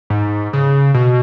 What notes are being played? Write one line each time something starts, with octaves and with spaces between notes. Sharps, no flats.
G#2
C#3
B2